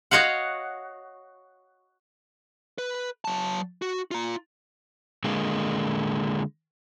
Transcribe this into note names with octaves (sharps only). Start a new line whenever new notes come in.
F#4 C#5 D#5 F5 F#5
B4
F#3 A5
F#4
F4 A#5
D3 G#3 A#3